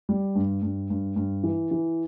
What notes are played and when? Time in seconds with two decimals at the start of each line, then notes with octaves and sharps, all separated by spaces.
0.09 G3
0.36 G2
0.62 G2
0.90 G2
1.16 G2
1.44 E3
1.71 E3